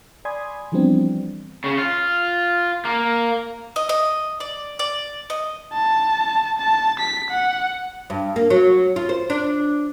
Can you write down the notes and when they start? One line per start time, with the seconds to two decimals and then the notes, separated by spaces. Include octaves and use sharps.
0.25 D5 G#5 B5 C6 D#6 G#6
0.72 E3 F3 G3 B3 C4 D4
1.64 C#3
1.78 F4
2.85 A#3
3.76 D#5
3.89 D#5
4.40 D5
4.79 D5
5.30 D#5
5.73 A5
6.58 A5
7.00 B6
7.31 F#5
8.10 G2
8.36 A#3
8.50 F#3
8.96 F4
9.09 C5
9.30 D4